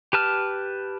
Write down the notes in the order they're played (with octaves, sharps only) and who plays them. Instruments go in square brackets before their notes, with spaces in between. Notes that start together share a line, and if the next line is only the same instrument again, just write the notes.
[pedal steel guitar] G4 B4 A5 F6